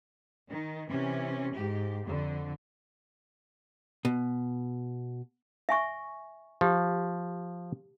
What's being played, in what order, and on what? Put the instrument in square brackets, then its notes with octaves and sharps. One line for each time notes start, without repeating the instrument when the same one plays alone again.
[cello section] D#3
C3 E3 C#4
G#2 G4
F2 D3
[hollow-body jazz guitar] B2
[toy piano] E5 G#5 C#6
[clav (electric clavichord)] F3 [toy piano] G4